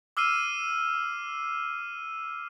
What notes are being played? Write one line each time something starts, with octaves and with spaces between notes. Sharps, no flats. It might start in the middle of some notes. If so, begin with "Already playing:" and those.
D6 E6 F6 C7 D#7